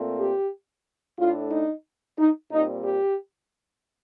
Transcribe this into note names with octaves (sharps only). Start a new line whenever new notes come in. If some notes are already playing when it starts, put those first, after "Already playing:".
Already playing: A#2 A3 C4
G4
A2 A3 D4 F4
D#4
D#4
A#2 G3 C4 D#4
G4